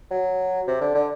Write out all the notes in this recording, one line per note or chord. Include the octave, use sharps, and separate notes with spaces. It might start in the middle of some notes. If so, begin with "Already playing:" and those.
F#3
C3
D3
D3